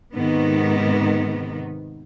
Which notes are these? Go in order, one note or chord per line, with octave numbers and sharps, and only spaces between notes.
G#2 C3 D#3 B3